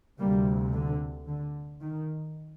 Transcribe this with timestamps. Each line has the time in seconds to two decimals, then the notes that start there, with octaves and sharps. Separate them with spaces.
0.19 D2 C3 G3 A#3
0.73 D3
1.27 D3
1.81 D#3